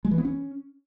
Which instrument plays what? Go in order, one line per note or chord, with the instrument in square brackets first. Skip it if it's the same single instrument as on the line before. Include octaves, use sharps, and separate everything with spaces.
[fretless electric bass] G#3
E3
B3
C#4